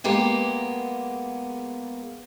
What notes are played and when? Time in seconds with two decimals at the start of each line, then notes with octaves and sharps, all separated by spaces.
0.04 G#3 A#3 B3 G4